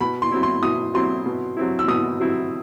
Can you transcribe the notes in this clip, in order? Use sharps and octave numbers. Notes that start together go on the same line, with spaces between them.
B2 B5
C6
F#3 C4 E4
C6
B2 D#6
F#3 C4 E4 C6
B2
F#3 C4 E4
E6
B2 D#6
F#3 C4 E4